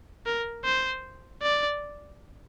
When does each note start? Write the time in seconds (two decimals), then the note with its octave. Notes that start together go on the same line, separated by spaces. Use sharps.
0.26 A#4
0.64 C5
1.42 D5